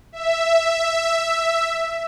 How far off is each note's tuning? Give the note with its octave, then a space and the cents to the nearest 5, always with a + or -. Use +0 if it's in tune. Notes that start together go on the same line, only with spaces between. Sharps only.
E5 +5